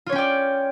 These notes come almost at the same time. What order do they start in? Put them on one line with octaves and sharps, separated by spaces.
F4 C#5 C#4 G5 D5